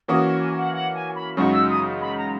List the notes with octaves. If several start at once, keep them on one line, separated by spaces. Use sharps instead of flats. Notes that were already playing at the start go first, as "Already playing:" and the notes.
E3 A#3 C#4 F#4 A#4 D#6
C#6
G#5
F#5
F#5
G#5
B5
F#2 C#3 G#3 D#4 F#4 C#6
E6
D#6
B5
A#5